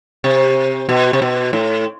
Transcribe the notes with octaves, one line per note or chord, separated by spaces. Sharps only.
C3
B2
C3
B2
A2